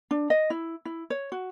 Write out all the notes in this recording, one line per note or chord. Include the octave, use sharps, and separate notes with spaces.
D4
D#5
E4
E4
C#5
F#4